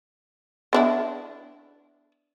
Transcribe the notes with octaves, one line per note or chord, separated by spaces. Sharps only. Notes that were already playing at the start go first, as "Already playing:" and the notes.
B3 D4 E4